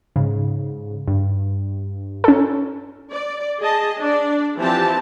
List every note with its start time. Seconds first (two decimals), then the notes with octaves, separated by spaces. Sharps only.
0.16 G#2 C#3
1.08 G2
2.24 C#4 A4
3.11 D5
3.59 G#4 D#5 A5
3.99 D4 D5
4.58 E3 F3 C4 G4 A5